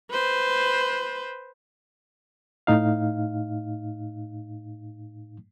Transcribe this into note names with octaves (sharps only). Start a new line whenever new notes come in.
B4 C5
A2 D#4 F5